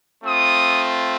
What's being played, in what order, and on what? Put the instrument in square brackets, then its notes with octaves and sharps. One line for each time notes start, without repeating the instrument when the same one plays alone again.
[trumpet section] A3 C4 F4 D#6